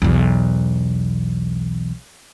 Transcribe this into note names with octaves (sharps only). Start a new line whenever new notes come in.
B1 E2